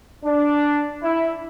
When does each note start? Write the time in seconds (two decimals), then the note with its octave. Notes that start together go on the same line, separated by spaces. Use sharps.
0.24 D4
1.02 E4